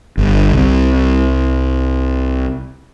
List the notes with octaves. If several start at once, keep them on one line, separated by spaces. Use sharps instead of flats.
G1
C2